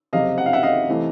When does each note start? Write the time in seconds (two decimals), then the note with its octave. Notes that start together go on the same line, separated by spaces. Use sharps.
0.13 F#1 F2 C3 D#5 F5
0.38 F#5
0.46 F5
0.53 E5 F#5
0.63 D#5 F5
0.89 C3 E3 A3